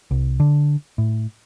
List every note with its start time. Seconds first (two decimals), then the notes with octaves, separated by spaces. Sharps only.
0.11 C2
0.40 D3
0.98 A2